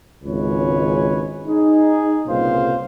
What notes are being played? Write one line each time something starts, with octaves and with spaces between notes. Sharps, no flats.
G#1 C#2 G#3 C#4 B4 C#5
D#4 G#4
C2 A#2 C#3 B3 C5 F5